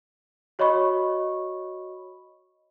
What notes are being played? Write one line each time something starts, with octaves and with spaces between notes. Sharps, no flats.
F#4 C#5 D#5 B5 C#6